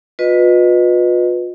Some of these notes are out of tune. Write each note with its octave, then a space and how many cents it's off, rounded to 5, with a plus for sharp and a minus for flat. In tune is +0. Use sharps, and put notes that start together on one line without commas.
F4 +40 B4 +0 D#5 -10